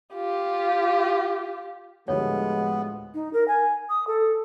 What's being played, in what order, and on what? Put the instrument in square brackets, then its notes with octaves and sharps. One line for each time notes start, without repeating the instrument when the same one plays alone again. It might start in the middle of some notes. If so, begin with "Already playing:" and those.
[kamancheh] F4 G4
[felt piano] D2 A2 G3 [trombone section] F3 G#3 [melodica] B3 [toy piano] C#5
[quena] D#4
A#4
G#5
D#6
A4